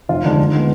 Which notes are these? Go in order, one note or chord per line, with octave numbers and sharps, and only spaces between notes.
F1 F4
D#2 D3 G#3 D4
D#2
D3 G#3 B3